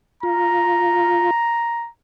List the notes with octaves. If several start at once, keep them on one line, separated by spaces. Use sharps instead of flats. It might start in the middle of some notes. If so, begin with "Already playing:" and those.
F4 A#5